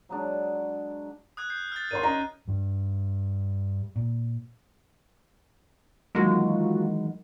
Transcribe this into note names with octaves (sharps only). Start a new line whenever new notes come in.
F#3 G#3 D4
D#6 F#6 G#6
G6 C7
F6 F#6 A6
A#4 C#5 C6 D#7
C#4 D#5 A#5
G2
A#2
D#3 E3 F#3 G#3 A#3 F4 F#4